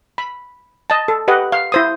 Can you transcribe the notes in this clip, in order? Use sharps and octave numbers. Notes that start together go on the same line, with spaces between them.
B5
D#5 A5
A4
G4 B4 D#5 F#5
F5
E4 C5 D#6